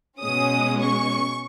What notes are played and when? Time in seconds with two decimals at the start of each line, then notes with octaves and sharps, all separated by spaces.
0.20 B2 G#3 C#4 D#6
0.80 C#6